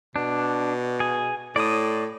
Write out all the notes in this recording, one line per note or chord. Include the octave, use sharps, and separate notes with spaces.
B2 D4
G#4
A2 D5 D#6